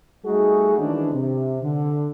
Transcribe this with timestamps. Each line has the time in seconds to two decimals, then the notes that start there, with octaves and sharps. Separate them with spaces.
0.25 G3 A3 D#4 F#4 G#4
0.78 D#3 E3 G#3 C#4 D4
1.13 C3
1.62 D3